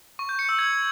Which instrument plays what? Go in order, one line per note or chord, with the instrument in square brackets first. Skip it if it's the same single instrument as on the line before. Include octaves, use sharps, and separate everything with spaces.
[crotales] C#6
G6
C#7
E6
G#6